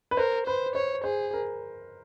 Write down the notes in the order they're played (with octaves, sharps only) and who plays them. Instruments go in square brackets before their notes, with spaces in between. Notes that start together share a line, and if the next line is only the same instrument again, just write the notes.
[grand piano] B4
[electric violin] A#4 [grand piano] C5
[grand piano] B4 [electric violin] C5
[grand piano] C5 [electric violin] C#5
[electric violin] G#4 [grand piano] C5
[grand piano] A#4